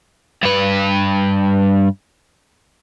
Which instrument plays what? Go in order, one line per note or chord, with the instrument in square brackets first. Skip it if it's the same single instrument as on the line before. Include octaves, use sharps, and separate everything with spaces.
[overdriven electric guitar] G2 B4